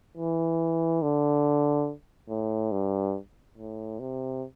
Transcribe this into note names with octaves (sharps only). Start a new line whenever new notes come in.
E3
D3
A2
G2
A2
C3